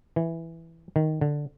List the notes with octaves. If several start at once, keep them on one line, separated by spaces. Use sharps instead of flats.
E3
D#3
D3